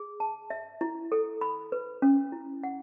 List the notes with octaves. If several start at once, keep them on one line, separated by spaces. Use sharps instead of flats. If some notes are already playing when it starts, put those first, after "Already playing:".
Already playing: G#4
A5
E5
E4
A4
B5
B4
C#4
E4
F#5